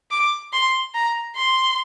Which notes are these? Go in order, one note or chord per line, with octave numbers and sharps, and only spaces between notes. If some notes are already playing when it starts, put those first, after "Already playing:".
D6
C6
A#5
C6